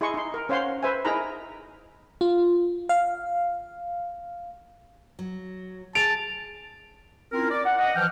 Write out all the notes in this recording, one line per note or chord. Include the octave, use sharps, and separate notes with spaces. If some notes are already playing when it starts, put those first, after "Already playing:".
E4 G#4 D#5 C6 C#6
D#4 C6
A#4
C#4 C5 C#5 F5 F#5 C6
B4 C5 E5 G#5
D#4 E4 G#4 A#4 A#5 B5
F4
F5
F#3
G#4 A5 D7 F7
C4 C#4 E4 F4 A#4
D5
F#5
D#5 F#5
E3 F3 G5 F6